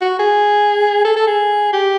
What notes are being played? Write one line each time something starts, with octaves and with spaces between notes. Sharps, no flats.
F#4
G#4
A4
A4
G#4
G4